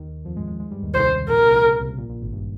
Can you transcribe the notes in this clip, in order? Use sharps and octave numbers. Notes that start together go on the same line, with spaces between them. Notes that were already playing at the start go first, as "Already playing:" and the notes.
Already playing: D#2 D#3
F2 F3
G#2 G#3
G#2 G#3
G#2 G#3
G2 G3
D#2 D#3
C2 C3 C5
C#3
C3
A#1 A#2 A#4
C2 C3
C#2 C#3
C2 C3
A#1 A#2
A#1 A#2
G#1 G#2
G2